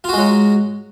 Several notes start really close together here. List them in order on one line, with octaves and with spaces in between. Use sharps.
F4 F#4 G#3 F#3